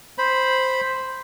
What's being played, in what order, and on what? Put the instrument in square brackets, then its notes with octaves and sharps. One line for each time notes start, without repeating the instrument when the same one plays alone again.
[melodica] C5 B5